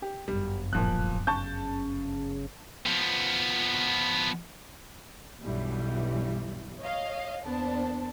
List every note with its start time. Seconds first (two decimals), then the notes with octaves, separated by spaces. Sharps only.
0.02 G4
0.28 G1 F#2 G3
0.73 D1 A#2 F3 F#6
1.27 C#3 A5 C#6 G6
2.86 F3 B3
5.42 B1 G2 B2 E3 G3
6.80 C#5 D#5 F5
7.44 E2 A#3 B3 D4 C5 A5